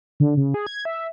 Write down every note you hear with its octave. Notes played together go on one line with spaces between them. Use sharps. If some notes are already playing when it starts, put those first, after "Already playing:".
D3
C#3
G#4
G#6
E5